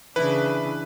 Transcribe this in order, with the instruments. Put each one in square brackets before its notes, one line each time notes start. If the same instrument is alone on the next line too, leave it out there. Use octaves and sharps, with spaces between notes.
[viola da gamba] C#3 D4 [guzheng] E3 E4 [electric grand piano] B4